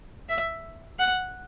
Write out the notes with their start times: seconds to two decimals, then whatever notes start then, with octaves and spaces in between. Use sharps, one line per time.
0.29 E5
0.99 F#5